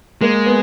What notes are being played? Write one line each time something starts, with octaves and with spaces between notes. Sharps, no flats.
G#3 A#3
B3